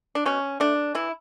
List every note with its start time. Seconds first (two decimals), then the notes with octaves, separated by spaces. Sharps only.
0.15 D4
0.25 B2 C#4
0.60 A3 D4
0.95 E3 E4